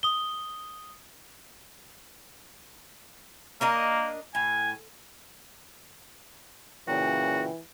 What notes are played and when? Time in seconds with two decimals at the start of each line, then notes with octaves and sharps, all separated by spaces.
0.03 D#6 G7
3.61 A#3 D4 A#4 D#5
4.35 A2 G#5
6.88 A#2 C#3 E3 F#4 G5